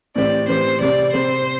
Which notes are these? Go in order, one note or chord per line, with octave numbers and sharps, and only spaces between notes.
A2 E3 C4 G4 D5
A2 E3 C4 G4 C5
C3 G3 C4 D5
C3 G3 C4 C5